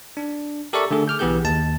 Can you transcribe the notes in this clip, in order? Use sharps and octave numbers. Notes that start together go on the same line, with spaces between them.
D4
G4 A4 A#4 D5 E5 C#6
D3 A3 D4 G#4 A4
D6 F6 G6
B1 E3 B3 G4 G#4 G6
D#2 A5